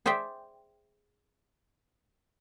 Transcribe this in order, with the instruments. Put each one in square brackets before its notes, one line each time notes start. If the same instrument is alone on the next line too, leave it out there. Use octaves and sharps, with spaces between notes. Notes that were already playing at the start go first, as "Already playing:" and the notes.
[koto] G#4 C5 D5 E5 G5